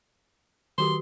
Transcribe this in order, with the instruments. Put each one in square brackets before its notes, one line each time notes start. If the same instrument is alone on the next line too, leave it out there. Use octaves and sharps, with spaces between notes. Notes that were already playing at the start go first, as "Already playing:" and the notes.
[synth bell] D#3 F#4 G4 [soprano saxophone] C6